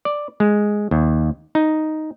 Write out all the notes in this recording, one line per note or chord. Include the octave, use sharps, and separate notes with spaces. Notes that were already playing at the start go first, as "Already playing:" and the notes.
D5
G#3
D#2
D#4